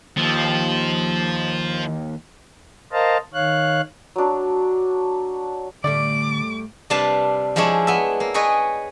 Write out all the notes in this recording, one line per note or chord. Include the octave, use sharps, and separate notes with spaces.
D#2 F3
A#4 C5 D#5 F5 A5 A#5
D#3 C#5 F5 F#6
F#3 D4
A2 D3 G3 A3 D5 D6
C3 G3 D4 B4 F5 A5
F3 G#3 D4 E4 C#5
B3 E5
A#3
G#4 B4 C#5 D#5 G5 G#5